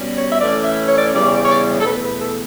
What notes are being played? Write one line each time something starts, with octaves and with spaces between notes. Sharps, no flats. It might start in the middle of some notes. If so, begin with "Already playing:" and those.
Already playing: B2 G3 C#4
C#5
E5
A2 E3 A3 C#4 D5
E5
C#5
D5
C#5
E2 C#3 E3 G3 C#4 D5
C#5
D5
C#5
D5
C#5
A4
E2 B2 A3 B4
B4
A4